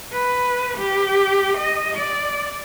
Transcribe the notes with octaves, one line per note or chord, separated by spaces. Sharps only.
B4
G4
D#5
D5